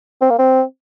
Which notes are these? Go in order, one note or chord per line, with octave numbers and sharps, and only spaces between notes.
C4
A#3
C4